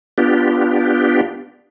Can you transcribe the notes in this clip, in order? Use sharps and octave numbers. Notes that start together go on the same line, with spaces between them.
B3 D4 F4 G4